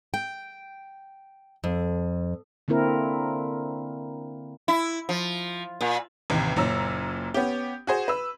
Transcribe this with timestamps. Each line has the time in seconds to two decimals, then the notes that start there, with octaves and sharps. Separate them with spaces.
0.14 G5
1.64 F2
2.68 D3 A#3 C4 E4 A#4
4.68 E4
5.09 F3
5.81 A#2
6.30 A1 D#2 C3
6.56 F#1 A#2 C#4 A#5 E6
7.34 B3 C#4 G4
7.87 F#4 G#4 C5
8.08 B4 E6